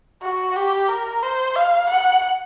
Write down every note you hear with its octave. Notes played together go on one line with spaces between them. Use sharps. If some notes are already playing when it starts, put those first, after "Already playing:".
F#4
G4
A#4
C5
F5
F#5